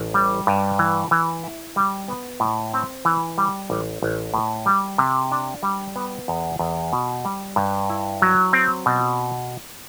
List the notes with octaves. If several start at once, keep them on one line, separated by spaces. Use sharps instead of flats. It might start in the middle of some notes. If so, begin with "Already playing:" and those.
Already playing: A1
G3
G2
E3
E3
E4
G3
B3
A2
C4
E3
G3
A1
A1
A2
G3
C3
D4
G3
B3
E2
E2
B2
G3
G2
E4
F#3
C4
B2